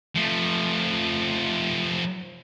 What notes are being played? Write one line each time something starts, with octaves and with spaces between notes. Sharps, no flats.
F3 A3